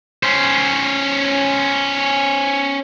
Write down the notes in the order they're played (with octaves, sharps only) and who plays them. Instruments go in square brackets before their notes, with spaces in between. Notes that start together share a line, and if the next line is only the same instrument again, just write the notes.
[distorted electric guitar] C#4 C5